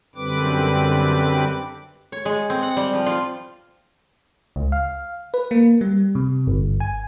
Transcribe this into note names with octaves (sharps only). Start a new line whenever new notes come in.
F#2 D3 G3 C4 B4 D6
C#5
G#3
C4
F#5
G3
F3
F4
C#2
F5
B4
A#3
G3
C3
G1
G#5